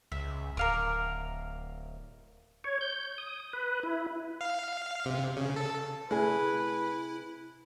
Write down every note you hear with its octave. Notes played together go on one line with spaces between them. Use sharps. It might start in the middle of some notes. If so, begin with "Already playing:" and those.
C#2 E5
D1 A#4 F5 D6
C#5
G6
D#6
B4
E4
F5
C3
C#3
A4
C3 A3 E4 G#4 B4